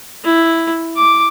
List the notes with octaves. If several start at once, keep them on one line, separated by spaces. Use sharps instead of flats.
E4
D6